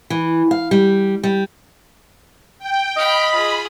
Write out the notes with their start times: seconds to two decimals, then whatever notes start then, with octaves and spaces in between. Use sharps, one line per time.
0.10 E3
0.51 F5
0.71 G3
1.23 G3
2.59 G5
2.97 D#5 F5 G5 B5
3.33 F4 G#4